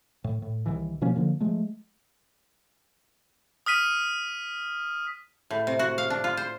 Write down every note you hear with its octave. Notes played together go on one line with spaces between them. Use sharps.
A2
A2
C2 D#3 E3
B2 F3 A#3 C#4
D3 D#3 F3 A#3
F3 G#3 A3
D#6 F6 B6 D#7
A2
C3
F#4
F5
D4
F4
C5